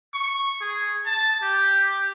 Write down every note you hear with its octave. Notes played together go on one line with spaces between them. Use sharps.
C#6
G#4
A5
G4